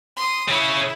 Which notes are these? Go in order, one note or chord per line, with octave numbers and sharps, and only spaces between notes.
C6 D#6
C#3 C#4 E4